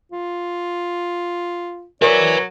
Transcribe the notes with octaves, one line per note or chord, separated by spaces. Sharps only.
F4
F#3 A#4 B4 D5 E5